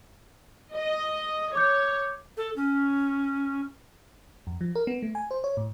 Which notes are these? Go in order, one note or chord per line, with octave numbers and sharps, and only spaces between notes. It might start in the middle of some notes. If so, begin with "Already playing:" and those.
D#5
C#5 D6 G6
A4
C#4
F2
F3
A#4
B3
A3
G#5
C5
C#5
A2